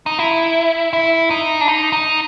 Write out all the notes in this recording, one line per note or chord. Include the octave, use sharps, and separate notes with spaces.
D#4
E4
E4
D#4
D4
D#4
D#4